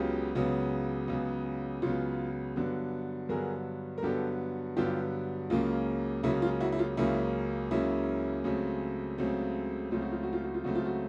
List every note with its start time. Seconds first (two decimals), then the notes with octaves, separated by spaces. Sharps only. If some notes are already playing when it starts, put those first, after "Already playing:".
Already playing: C#2 C#3 F#3 B3 F4 G4
0.35 C#2 C#3 F#3 B3
1.08 C#2 C#3 F#3 B3
1.82 C#2 C#3 F#3 B3 F4
2.56 G2 D3 F#3 B3
3.29 G2 D3 F#3 B3 G#4 A#4
3.98 A#4
4.03 G2 D3 F#3 B3 G4 A4
4.77 G2 D3 F#3 B3 F4 G4
5.50 C#2 C#3 F#3 A#3 C#4 F4
6.23 C#2 C#3 F#3 A#3 C#4 E4
6.42 F4
6.60 E4 F#4
6.72 E4
6.79 F4
6.97 C#2 C#3 F#3 A#3 C#4 E4
7.71 C#2 C#3 F#3 A#3 C#4 E4
8.44 C#2 C#3 F#3 A3 C4
9.18 C#2 C#3 F#3 A3 C4
9.91 C#2 C#3 F#3 A3 C4 F4
10.02 F#4
10.12 F4
10.23 F#4
10.33 F4
10.44 F#4
10.54 F4
10.64 C#2 C#3 F#3 A3 C4 F#4
10.75 F4
10.85 F#4